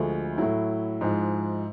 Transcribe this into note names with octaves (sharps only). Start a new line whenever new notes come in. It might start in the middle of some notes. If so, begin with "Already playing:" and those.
Already playing: D2 D3 F3 G#3
A2 F#3 E4
G#2 F3 G#3